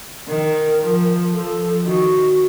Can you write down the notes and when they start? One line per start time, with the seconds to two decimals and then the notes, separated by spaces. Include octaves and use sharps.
0.28 D#3 A#4
0.81 F3
1.33 F3 A4
1.85 D#3 F#4